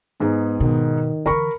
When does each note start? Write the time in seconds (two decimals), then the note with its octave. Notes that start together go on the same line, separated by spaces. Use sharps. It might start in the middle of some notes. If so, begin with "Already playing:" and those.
0.20 G#2 B3 D#4 G#4
0.60 B2 D#3
1.26 D3 E3 A#4 B5 C#6